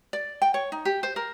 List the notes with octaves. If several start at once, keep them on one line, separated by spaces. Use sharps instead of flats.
D5
G5
C#5
D#4
G4
C5
A#4